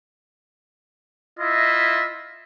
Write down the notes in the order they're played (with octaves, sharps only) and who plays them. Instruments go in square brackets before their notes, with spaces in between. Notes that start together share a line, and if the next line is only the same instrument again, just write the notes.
[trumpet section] E4 F4 D#5 E5